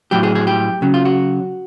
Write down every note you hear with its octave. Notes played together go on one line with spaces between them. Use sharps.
A2 F#3 G4
G#4
G#4
G4
C#3 F#3
F4
F#4